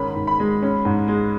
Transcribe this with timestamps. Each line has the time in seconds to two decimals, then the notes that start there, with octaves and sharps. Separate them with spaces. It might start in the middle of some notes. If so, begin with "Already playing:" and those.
Already playing: G#2 D#3 C#4 B5
0.16 G#2
0.27 B5
0.39 G#3
0.62 C#4
0.85 G#2
1.08 G#3